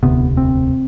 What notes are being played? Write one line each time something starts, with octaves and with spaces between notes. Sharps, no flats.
E1 D2 C3 B3
C4